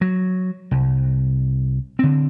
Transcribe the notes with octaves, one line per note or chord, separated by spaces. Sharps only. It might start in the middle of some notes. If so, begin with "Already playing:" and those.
F#3
C2
D3 C4